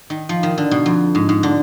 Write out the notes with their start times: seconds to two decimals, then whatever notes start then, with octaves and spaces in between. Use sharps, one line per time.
0.10 D#3
0.29 F3
0.43 D#3
0.58 D3
0.71 B2
0.86 F2
1.15 G#2
1.29 G#2
1.43 D3